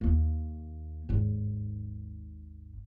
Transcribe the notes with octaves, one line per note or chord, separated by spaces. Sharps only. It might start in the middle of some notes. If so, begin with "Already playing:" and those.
D#2 A#3
G#1 D#2